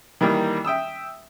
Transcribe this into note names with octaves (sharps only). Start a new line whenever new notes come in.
D#3 E3 G3 A#3
E5 G5 D#6 E6